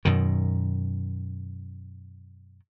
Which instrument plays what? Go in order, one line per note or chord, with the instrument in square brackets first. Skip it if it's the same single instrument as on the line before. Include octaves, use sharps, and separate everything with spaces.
[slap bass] F#2 B2 D#3